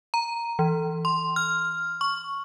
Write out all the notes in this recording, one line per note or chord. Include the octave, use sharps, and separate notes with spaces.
A#5
E3
C6
F6
C#6